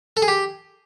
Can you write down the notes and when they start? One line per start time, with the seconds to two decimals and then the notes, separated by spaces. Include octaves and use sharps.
0.17 A4
0.22 G#4
0.28 G4